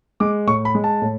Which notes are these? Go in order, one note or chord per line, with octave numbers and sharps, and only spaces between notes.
G#3 D6
A2 C#6
B5
G#3
A5
A2